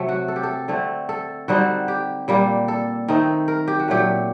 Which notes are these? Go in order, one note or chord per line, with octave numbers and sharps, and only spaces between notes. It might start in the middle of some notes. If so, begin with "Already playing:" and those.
Already playing: C3 F#3 A3
F#4
A4
G4
A4
D3 A3 C4
A4
D3 G3 C4 D#4 F#4
G4
A#2 G3 A#3
A4
D#3 A3 C4 D#4
A#4
G4
F#4
A#2 F#3 A3 G4